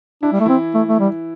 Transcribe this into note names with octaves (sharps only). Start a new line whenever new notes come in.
D4 E4
G3
A3
E3 C4 E4
A3
A3
G3